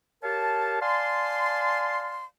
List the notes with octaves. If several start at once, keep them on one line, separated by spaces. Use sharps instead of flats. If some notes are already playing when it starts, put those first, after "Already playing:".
G4 A#4 C#5 F5 A5
D5 F5 G#5 A5 C6